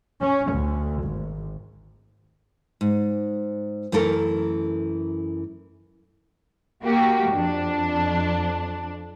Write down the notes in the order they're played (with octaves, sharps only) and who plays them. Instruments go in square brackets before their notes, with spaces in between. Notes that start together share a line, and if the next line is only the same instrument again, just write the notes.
[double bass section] C#4
D2
G#1
[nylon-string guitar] G#2
F#2 E3 A3 A4 A#4
[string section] A#3 F#4 G4
F2 D4